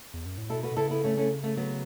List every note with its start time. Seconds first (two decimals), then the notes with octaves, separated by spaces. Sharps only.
0.14 E2
0.26 F#2
0.38 A2
0.50 B2 E4 A4
0.63 F#4 B4
0.71 B2
0.77 C#3 E4 A4
0.90 B3 E4
1.03 A3 C#4
1.17 A3 C#4
1.43 A3 C#4
1.57 F#3 B3